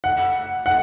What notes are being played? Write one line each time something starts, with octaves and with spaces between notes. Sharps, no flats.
F#5
F#5